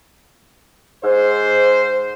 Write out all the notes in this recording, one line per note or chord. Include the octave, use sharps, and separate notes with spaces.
G#2 C5